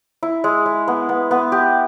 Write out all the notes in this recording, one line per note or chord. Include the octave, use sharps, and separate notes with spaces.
E4
G#3
G#3
B3
B3
B3
G4